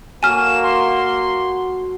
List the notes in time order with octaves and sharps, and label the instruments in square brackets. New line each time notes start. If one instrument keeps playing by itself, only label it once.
[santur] F#3 A3 F#4 [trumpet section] A#3 [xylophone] G#5 F6 [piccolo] E7
[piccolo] C6